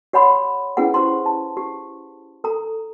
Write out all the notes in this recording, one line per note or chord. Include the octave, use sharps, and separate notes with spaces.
G4 C#5 F#5 B5 C6 D6
C#4 E4 G#4 B4 F#5
G4 C5 A#5 C6
A5
G4
A4 A#5